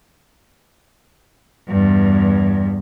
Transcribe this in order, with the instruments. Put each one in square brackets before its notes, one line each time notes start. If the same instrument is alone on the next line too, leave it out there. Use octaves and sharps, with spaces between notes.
[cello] E2 G2